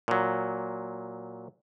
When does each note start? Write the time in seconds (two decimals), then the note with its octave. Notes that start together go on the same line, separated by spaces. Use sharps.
0.08 A#2 F#3